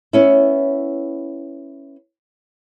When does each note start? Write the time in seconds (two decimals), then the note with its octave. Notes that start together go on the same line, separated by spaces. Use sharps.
0.13 B3 C#4 E4